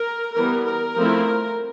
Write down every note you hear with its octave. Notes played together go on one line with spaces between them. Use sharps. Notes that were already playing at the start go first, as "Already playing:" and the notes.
Already playing: A#4
E3 G3 B3 A#4
A#4
F3 A3 C4 E4